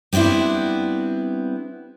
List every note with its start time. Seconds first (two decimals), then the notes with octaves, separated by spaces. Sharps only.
0.13 G3 B3 C4 D4 E4